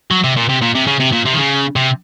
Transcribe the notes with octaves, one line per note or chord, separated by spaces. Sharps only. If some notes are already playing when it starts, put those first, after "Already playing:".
F#3
C3
A#2
C3
A#2
C3
C#3
C3
A#2
C3
D#3
C#3
C3